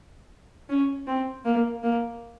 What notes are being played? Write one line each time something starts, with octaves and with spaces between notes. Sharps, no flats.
C#4
C4
A#3
A#3